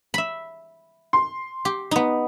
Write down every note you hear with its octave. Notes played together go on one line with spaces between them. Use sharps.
E5 B5
C6
G4
B3 D#4